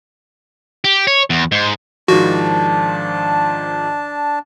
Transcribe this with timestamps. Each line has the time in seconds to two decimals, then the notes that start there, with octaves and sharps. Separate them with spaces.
0.84 G4
1.07 C#5
1.30 E2
1.52 G#2
2.08 G#2 D#3 F3 D4 F#4 A5